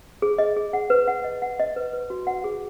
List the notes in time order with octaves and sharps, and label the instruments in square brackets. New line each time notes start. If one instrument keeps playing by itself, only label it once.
[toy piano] G#4
D#5
G#4
F#5
B4
F#5
D#5
F#5
D#5
B4
B4
F#4
F#5
G#4